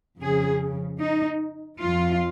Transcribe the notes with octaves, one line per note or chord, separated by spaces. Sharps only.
F2 C#3 F3 G#4
D#4
F2 F3 F4